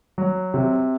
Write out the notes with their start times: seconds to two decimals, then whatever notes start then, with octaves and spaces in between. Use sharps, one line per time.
0.18 F#3
0.54 C3